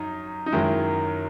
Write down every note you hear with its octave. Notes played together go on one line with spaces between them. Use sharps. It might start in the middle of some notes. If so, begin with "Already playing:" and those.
Already playing: F#2 D#4
D#4
F#2 D#3 G#3 E4